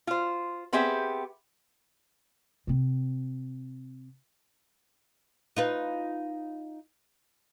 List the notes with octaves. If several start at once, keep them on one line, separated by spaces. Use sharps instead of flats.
F4 C5
B3 C4 G4 G#4 E5
C3 C4
D#4 F4 B4